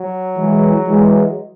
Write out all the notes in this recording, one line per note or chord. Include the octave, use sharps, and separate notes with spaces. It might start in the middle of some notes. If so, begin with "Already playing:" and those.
Already playing: F#3
E3 G#3
E3 G#3